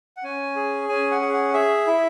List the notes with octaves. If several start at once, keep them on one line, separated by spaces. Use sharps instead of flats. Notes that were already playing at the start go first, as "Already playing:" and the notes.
F#5
C#4 G#5
G#4
C#4 G#5
F#5
G#4
F#5
G#4 E5
E4